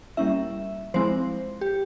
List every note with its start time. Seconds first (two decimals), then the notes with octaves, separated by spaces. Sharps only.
0.17 G3 A#3 C#4 E4 E5
0.94 F3 G#3 C4 E4 C5
1.61 G4